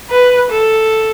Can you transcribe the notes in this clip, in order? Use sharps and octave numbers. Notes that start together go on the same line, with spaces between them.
B4
A4